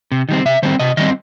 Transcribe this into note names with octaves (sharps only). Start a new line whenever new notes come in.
C3
D#3 G3 C4
C3 E5
D#3 G3 C4 C5
C3 D#5
D#3 G3 C4 D#5